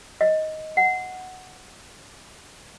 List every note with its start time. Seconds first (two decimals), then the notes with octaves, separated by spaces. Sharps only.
0.21 D#5
0.77 F#5